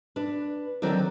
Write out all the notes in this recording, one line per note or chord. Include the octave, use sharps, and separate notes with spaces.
D4 B4
D3 D#3 F#3 C4 A4 D5